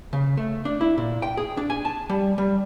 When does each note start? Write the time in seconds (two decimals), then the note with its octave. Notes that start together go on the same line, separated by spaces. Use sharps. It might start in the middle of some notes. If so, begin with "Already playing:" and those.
0.13 C#3
0.37 A3
0.65 D4
0.81 E4
0.98 A#2
1.22 G5
1.37 G#4
1.57 D4
1.70 G#5
1.85 A5
2.09 G3
2.38 G3